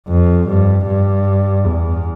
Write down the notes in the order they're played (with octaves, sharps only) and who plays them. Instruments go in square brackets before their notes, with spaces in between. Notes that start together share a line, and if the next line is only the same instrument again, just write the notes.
[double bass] F2
G2
G2
E2